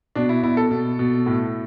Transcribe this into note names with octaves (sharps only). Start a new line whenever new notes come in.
B2 D4
E4
B2 E4
A4
B2
B2
A2